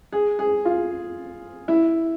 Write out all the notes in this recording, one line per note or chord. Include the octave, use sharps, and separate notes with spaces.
G#4
G#4
F4
E4